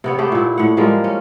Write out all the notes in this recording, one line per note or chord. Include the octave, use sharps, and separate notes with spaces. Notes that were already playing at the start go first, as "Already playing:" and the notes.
C3 B3 C#5
A3 B3 G4 G#4
A#2 E4
A2 F#5
F3 G3 G#3 A#3
C#4